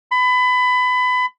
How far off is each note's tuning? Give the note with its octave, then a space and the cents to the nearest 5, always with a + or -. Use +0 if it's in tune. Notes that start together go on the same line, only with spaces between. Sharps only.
B5 +25